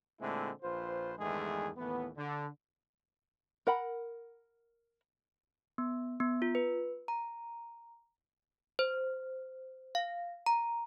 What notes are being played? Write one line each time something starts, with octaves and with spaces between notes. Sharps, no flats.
A#2 D3 G#3 A3 C4 E4
A#1 F4 B4 C5
E2 G2 D#3 G#3 A3 G#4
D#2 A2 E3 B3
D3
A#4 F#5 B5
B3
B3
F4
B4
A#5
C5
F5
A#5